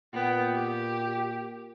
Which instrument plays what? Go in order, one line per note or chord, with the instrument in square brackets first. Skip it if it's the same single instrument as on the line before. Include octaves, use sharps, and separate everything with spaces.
[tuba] A#2 [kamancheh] B3 G5
[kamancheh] G4